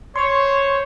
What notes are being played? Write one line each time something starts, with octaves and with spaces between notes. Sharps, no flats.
C5 C#5 C6 C#6